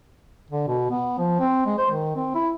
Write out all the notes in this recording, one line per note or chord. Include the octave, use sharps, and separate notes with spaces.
D3
B2
B3
F3
C4
G#3
C5
D#3
C4
E4